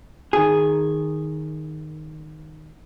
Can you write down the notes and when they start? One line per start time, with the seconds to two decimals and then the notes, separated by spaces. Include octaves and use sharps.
0.33 D#3 G#4